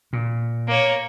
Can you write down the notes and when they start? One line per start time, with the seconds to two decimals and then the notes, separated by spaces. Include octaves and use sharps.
0.13 A#2
0.68 A#3 C#5